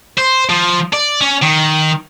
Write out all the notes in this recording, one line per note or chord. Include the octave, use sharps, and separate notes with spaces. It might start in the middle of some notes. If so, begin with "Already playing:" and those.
C5
F3
D5
C#4
D#3